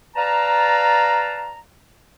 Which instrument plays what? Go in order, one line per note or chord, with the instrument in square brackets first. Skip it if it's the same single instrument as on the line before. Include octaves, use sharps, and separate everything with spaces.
[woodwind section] B4 D5 F5 A5 A#5